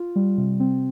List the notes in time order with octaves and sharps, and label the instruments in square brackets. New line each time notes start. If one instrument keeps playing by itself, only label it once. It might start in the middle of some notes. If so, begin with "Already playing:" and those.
Already playing: [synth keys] F4
G3
C3
C4